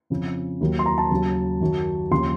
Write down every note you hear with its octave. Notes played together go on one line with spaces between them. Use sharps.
F2 C#3 F3
D#2 D#3 F#3
C6
A#5
A5
D#2 C#3 F#3
F#2 D#3 F#3
D#2 C#3 F3 C6